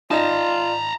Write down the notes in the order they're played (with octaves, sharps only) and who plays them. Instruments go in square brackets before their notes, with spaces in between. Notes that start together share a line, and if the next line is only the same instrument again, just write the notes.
[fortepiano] D#4 [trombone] F4 [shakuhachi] D5 [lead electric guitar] A5 A#5